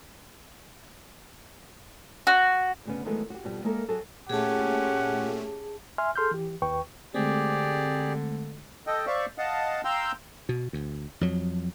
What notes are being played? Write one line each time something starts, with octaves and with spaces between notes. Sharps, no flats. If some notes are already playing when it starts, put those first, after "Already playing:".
F#4
D2 C#3 B3
D#3 E3 F#3 G#3 A3 B3
F#4 G4
F2 B2 G3
G#3 A#3 A4 A#4 E5
F#3 F#4 G#4 A4
A#2 A3 C#4 G4 G#4 F#5 A5
E5 G#5 C6 F6
G#4 A4 C6 F6 G6
E3 G4
D#2 B4 G5 C#6
D3 G#3 A3 C4 G4 G#4 D5
A4 D#5 G5
C5 D5 E5 F5 C#6
D#5 F5 F#5 A5
F5 G5 A#5 C6 E6 G6
B2
D2
F2 F#3